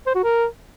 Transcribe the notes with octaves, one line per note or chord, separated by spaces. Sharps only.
C5
F#4
A#4